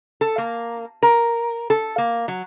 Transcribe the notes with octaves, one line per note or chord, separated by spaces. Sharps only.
A4
A#3
A#4
A4
A#3
F#3